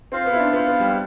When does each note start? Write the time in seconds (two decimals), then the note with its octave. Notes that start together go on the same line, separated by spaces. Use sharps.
0.12 C4 F4 C5 F5
0.26 B3
0.33 E4
0.40 D4
0.52 B3 F4
0.55 C5 F5
0.67 B3
0.80 G3